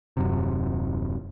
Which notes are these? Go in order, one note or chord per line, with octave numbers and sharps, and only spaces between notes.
D#1 F#2 C3